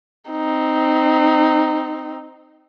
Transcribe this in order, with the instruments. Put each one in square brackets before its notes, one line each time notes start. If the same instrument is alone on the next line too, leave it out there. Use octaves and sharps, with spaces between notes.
[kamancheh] C4 D#4